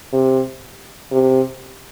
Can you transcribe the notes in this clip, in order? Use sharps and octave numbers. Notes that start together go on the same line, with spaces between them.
C3
C3